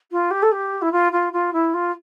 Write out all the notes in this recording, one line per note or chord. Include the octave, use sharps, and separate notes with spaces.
F4
G4
A4
G4
E4
F4
F4
F4
E4
F4